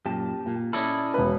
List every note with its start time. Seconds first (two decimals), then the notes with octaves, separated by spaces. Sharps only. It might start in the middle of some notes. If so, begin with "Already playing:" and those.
0.06 F#2 A#2 G4 A5
0.46 A#2
0.73 C#4 E4 A4 D5 D#5 B5
1.14 E1 B4